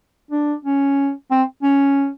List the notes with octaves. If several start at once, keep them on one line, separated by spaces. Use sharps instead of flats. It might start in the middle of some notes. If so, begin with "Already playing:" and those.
D4
C#4
C4
C#4